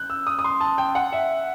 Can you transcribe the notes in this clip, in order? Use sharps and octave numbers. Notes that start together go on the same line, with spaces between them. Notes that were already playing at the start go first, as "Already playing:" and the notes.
Already playing: F#6 G6
E6
D#6
D#6
C6
A5
G5
F#5
E5